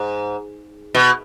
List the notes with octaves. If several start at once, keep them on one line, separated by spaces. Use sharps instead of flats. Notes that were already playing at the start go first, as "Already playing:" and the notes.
Already playing: G#2
B2